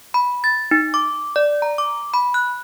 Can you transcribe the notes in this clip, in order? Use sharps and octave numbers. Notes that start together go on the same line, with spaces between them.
B5
A6
D#4
D6
D5
A#5
D6
B5
F#6